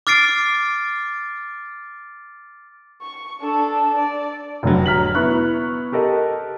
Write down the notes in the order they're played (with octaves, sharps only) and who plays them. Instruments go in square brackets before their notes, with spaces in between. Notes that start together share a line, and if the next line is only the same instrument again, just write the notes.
[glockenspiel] D6 F6 A6 C7 D7
[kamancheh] C#6
D4 A4
D5
[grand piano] F1 D3 F#3
A#5 F6 B6 F#7
B3 E4 C#6 F#6
G4 A4 A#4 D#5